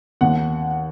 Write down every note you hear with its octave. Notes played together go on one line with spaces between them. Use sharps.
D#2 F#5